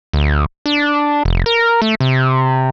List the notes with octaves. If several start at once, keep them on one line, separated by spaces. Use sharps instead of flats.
D2
D4
F1
A#4
A3
C3